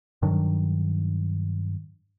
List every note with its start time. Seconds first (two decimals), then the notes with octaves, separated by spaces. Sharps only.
0.22 G2 D#3 F#3 D4